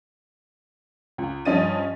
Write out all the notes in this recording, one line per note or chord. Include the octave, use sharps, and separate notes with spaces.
C#2
G2 F3 C#4 D#5 A6 D#7